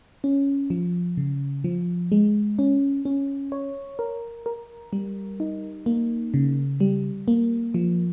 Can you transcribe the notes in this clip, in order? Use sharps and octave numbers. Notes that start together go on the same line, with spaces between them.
C#4
F3
C#3
F3
G#3
C#4
C#4
C#5
A#4
A#4
G3
D#4
A#3
C#3
G3
A#3
F3